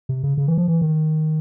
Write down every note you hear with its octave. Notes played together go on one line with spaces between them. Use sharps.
C3
C#3
C#3
E3
F3
E3
D#3